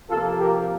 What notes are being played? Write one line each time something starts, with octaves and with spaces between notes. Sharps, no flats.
C3 F3 A#3 F4 A4
G4 A#4